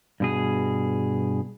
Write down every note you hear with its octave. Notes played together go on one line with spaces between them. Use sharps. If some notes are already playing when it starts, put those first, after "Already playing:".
G2 B2 G#4